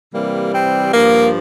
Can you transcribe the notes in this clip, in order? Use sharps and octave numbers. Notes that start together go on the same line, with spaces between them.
C3 E3 G3 A#3
C4
G2 F3 A#3